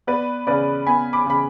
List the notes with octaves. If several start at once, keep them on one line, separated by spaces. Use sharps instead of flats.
B3 B4 D5
C#3 B4 D5
B3 G#5 B5
B5 D6
C#3 B5